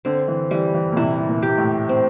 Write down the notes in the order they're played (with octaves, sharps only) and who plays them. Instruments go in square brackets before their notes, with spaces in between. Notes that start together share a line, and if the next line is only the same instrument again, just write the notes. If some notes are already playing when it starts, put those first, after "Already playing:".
[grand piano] D3 [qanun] C4
[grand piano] E3
[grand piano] E3 [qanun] G3
[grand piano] E3
A#2
[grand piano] C3 [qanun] E4
[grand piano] A#2
[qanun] G4
[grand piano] A2
[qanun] C4